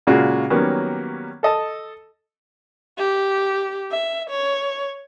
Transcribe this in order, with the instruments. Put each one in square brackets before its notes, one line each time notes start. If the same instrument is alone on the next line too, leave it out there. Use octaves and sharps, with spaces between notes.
[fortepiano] A#2 C#3 G#3 F4 F#4
D#3 F#3 G3 A#3 B3 C#4
A4 D#5 A5
[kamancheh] G4
E5
C#5